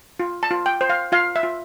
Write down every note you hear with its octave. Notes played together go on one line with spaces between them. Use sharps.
F4
A5
F4
G5
C5
F5
F4 F5
E5
F4